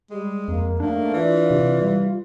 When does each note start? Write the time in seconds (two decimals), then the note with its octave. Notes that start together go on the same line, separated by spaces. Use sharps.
0.11 G3 G#3
0.48 F2 A#3
0.80 G#2 A3 A#3 D4
1.14 E3 F4 D5
1.51 C3
1.82 G3 F4